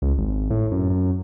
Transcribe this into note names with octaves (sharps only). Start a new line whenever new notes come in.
C#2
G#1
A2
F#2
F#2